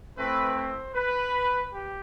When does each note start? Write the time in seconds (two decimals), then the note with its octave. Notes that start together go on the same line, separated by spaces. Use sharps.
0.17 A3 C4 E4 B4
0.57 C5
0.95 B4
1.73 G4